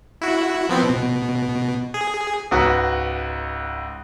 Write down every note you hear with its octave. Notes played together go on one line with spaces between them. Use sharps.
E4 F#4
F3 B3 C4
B2
G#4
C#2 G#2 F#4 B4